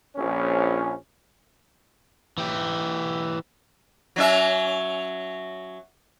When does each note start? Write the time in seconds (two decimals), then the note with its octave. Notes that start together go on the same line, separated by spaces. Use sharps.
0.16 A#1 C#4
2.38 E3 G4
4.16 F#3 C#4 E5